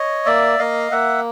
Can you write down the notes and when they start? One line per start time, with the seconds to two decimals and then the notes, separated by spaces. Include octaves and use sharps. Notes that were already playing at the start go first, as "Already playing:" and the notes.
Already playing: C#5 D#5
0.26 A#3 D5 E5
0.59 A#3 D#5 F5
0.92 A#3 E5 F#5